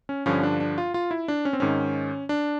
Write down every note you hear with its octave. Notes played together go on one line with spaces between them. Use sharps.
C#4
G2 D3 F3 C#4
D4
D4
F4
F4
E4
D4
C#4
C4
G#2 D#3 C#4
D4